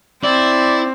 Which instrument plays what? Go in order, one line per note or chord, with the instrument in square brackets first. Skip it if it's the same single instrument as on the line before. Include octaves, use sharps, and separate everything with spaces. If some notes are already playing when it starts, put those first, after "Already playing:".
[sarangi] C4 [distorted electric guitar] E4 [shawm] D5